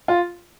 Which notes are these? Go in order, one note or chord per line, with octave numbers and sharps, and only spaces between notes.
F4